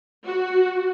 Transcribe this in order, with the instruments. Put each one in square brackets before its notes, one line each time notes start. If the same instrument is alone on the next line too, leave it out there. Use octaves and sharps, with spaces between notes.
[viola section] F#4